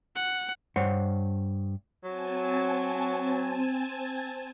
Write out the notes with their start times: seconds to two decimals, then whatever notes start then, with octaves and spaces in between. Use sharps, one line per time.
0.15 F#5
0.76 G2 C5 C#5 F#5
2.04 F#3 C4 G#5 A5